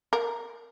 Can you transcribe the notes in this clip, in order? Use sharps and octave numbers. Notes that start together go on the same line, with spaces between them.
A#4